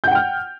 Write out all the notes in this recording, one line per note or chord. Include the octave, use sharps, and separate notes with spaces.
F#5 G5 F6 G6